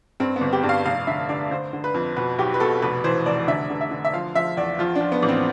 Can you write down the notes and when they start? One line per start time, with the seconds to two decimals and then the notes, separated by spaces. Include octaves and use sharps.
0.20 G2 C4
0.36 B3
0.41 G1
0.53 G4
0.63 G2
0.69 F5
0.85 F1 F5
1.07 D3 E5
1.29 D3 D5
1.51 D3 C5
1.73 D3
1.84 B4
1.94 F2
2.17 B2 B4
2.38 B1 G4
2.54 B4
2.60 B2 A4
2.82 F1 B4
3.04 E3 C5
3.26 F1 D5
3.48 D3 E5
3.70 D3
3.81 E5
3.91 D3
4.05 E5
4.13 F3 F5
4.35 F3 E5
4.57 E2 D5
4.79 F3 F4
4.95 D4
5.01 F3
5.12 B3
5.23 A1
5.28 C4